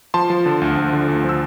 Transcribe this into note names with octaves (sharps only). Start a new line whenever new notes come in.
F3 A5 C6
F3
D3
D2
D2
D3
D2
F3 E6